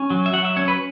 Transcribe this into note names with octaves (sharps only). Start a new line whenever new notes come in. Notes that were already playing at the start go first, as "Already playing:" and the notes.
Already playing: C#4
F#3
E5
F#3 F#5
E5
C#4 C#5
B4